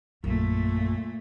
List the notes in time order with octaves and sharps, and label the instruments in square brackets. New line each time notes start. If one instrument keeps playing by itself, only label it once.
[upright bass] A#1 F#2 [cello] A#2 A3